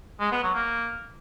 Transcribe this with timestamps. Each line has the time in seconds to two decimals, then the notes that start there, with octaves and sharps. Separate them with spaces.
0.20 G#3
0.32 B3
0.43 F#3
0.55 A#3